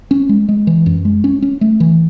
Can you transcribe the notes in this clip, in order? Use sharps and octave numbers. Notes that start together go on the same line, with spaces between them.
C#4
G#3
G#3
E3
F#2
G#3
C#4
C#4
A3
E3